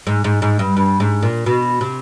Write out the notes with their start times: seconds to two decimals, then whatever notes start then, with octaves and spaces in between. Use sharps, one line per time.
0.07 G#2
0.24 G#2
0.42 G#2
0.59 G2
0.77 G2
1.00 G#2
1.23 A#2
1.46 B2
1.81 C3